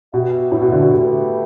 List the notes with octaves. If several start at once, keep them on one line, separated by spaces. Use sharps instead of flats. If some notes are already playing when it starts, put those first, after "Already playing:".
B2 B3 G4 E5
A2
B2
D3
B2
A3 G4 B4